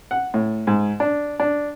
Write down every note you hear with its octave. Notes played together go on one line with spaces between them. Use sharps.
F#5
A2
G#2
D4
D4